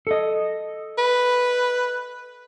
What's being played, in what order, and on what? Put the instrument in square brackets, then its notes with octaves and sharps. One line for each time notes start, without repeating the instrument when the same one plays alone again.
[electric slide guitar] A4 D#5
[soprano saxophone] B4